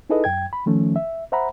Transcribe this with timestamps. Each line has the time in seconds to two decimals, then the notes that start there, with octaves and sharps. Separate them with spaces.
0.10 D#4 E4 G#4 A4 B4 D#5
0.24 F#2 G5 G#6
0.53 B5
0.66 D#3 F3 A3 C#4
0.96 E5
1.32 C5 E5 F#5 A#5 B5